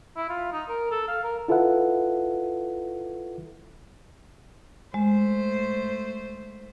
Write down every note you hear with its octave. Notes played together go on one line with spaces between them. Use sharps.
E4
F4
D#4
A#4
A4
F5
A#4
E4 F4 A4 B4 E5 F#5
G#3 A3 C5